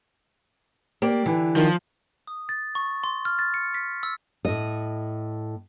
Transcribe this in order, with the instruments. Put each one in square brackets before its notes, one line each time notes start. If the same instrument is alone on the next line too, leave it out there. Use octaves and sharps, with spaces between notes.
[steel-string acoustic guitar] A#3 G4 D5
[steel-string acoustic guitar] D3 E3 [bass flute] E4
[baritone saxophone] D#3 [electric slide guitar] F3
[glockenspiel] D#6
A6
C#6
C6
F6
A6
C#7
B6
E6
[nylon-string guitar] A2 D#5